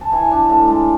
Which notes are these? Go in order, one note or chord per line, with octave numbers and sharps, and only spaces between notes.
A5
E3 G#5
D4 A5
A2 A5
G#3 A5